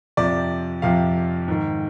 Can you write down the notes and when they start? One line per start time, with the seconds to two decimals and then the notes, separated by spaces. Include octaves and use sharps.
0.17 F2 C3 F3 D5
0.82 F2 C3 F3 F5
1.48 G#2 D#3